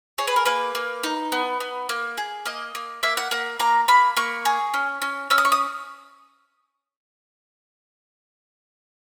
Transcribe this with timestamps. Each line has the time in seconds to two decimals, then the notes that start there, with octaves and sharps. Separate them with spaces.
0.18 G#4 C#5
0.27 B4
0.36 A#4
0.45 A#3 B4
0.75 A#3
1.03 D#4
1.32 B3
1.60 B3
1.89 A#3
2.18 G#4
2.46 A#3 D#5
2.75 A#3
3.03 A#3 E5
3.17 F#5
3.31 A#3 F#5
3.60 A#3 A#5
3.88 A#3 B5
4.17 A#3 C#6
4.45 G#4
4.74 C#4
5.02 C#4
5.30 C#4 E6
5.38 D#6
5.45 C#6
5.52 D#6